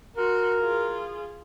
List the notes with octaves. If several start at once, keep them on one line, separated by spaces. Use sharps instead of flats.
F#4 A#4 C6
F4 G#4